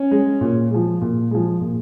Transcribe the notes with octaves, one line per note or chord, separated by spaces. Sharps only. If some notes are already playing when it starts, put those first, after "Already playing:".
Already playing: C#4
G#3
A#2
F3 G#3
A#2
F3 G#3
A#2